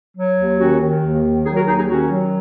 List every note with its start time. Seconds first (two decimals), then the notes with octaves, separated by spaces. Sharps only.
0.14 F#3
0.37 D#2
0.58 D#3 C#4 F#4
0.80 D#3
1.02 D#2
1.24 D#3
1.45 F#3 D#4 G#4
1.56 F#4 A#4
1.67 D#2 D#4 G#4
1.78 D#4 G#4
1.89 D#3 C#4 F#4
2.11 F#3